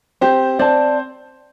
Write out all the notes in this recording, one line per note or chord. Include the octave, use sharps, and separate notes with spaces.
C4 G4 C5
C4 C5 D5 A5